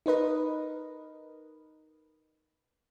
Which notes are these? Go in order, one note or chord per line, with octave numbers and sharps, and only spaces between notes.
D#4 A#4 B4 D#5